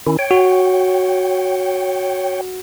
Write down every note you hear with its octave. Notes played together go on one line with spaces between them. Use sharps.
D#3 C#4 E4
C#5 G5
F#4